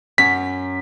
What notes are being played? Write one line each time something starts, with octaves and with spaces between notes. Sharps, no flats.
F#2 C#4 B6